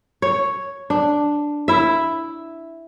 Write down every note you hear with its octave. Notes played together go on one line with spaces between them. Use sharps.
C#5
D4
E4 E5